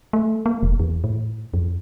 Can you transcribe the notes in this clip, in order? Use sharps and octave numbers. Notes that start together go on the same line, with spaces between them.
A3
A#3
E1
E2
A2
F2